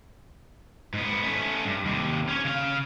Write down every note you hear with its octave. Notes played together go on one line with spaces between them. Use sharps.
G#2 B3
A3 C#4
G2
D#2 C3
C#4 C#5
C#3 F5